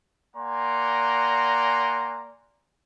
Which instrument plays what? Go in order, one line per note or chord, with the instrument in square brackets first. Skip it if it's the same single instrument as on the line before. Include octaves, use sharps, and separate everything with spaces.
[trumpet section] A#3 D5 F#5 G#5 A#5 C6